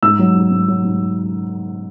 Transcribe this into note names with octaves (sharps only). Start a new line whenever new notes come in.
G#2 E6
F#3
G#2
G#2
F#3
G#2